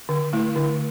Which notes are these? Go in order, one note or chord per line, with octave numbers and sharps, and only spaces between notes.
D3
A3 E4
D3